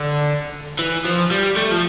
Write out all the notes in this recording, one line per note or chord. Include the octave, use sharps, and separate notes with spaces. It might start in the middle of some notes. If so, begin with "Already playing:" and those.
Already playing: D3
E3
F3
G3
A3
F3